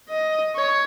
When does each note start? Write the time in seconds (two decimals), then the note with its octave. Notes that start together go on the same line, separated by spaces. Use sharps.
0.10 D#5
0.56 C#5